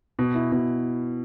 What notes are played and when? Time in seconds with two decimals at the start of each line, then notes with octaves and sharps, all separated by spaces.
0.19 B2
0.35 E4
0.52 B2